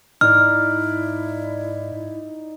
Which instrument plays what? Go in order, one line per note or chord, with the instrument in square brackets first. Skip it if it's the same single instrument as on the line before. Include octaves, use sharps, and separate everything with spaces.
[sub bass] G#2 [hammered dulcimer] D#4 D5 [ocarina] E4 [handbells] F6